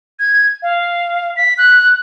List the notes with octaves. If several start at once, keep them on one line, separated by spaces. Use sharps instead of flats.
G#6
F5
B6
F#6